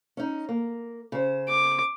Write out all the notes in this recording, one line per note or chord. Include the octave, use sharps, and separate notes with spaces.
C#4 D#4
A#3
C#3 C5
D6